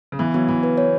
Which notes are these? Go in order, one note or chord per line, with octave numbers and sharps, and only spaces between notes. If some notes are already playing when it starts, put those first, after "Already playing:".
C#3
E3 B3
F#3 B3
E3 B3
B4
C#5